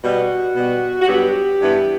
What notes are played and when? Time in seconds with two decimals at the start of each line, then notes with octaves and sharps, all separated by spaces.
0.04 B2 G3 B3 F#4
0.56 B2 G3 B3
1.02 F#4
1.08 G2 F#3 B3 G4
1.60 G2 E3 B3